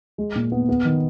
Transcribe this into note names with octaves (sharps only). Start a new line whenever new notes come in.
G#3
A#2
B3
B3
D#3